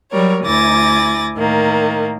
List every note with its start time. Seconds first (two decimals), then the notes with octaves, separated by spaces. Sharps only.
0.11 F#3 G3 A#4 C#5
0.44 D2 E4 G#5 D6 A6 A#6
1.36 A2 D#3 A#3